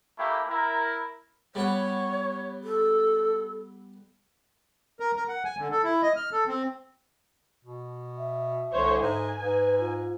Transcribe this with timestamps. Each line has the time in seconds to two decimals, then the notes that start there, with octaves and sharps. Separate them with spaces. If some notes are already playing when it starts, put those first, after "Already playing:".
0.18 A3 A#3 E4 G4
0.48 E4 A#4
1.55 G3 B3 C#5 F#5
2.64 A4
5.00 A#4
5.16 A#4
5.29 F#5
5.45 G#5
5.58 D3
5.71 A4
5.84 E4
6.02 D#5
6.16 F6
6.32 A4
6.48 C4
7.64 B2
8.18 E5
8.72 C2 D3 C5 C#5
9.01 G#2 G#5
9.40 G#2 B4
9.81 F4